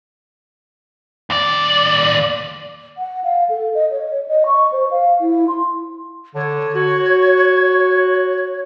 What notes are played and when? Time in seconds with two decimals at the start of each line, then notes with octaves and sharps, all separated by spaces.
1.30 D#2 D5
2.98 F#5
3.24 F5
3.49 A4
3.75 D#5
3.91 C#5
4.28 D#5
4.46 C#6
4.72 C5
4.91 F5
5.21 E4
5.48 C6
6.35 D3 C#5
6.75 F#4